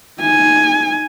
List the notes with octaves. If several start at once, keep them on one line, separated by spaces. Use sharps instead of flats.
D#4 G#5